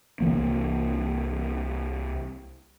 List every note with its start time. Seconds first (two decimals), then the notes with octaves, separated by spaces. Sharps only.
0.20 C2 E3 A#3